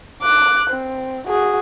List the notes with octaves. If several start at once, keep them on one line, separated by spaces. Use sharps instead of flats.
D6 F#6
C4
F#4 G#4